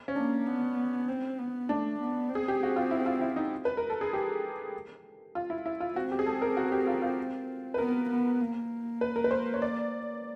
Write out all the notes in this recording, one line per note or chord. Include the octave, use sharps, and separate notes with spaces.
C#4
A#3 D4
B3
C4
B3
A3 D4
B3
C4
G#4
G4
F#4
F4
E4
F4
E4
D#4
B4
A#4
A4
G#4
G4
F4
E4
E4
F4
C4 F#4
G4
G#4
A4
A#4
F#4
G4
F4
F4
B4
B3 A#4
B3
A#3
B4
A#4
B4
C5
C#5
D5